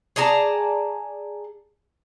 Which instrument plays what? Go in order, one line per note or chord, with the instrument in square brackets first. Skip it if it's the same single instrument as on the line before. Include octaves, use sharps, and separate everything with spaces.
[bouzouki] G#4 D5 A5 A#5